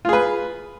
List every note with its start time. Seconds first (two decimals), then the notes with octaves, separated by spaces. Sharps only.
0.05 F4
0.09 G#4
0.13 B4